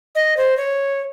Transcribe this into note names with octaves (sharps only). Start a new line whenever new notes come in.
D#5
C5
C#5